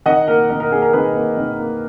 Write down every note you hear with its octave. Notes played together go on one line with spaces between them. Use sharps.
D#3 D#5 F#5
A#3 A#4
D#3 A#4
A#4
A#3 G#4
A#4
D#3 G#4 B4
A#3
D#3
A#3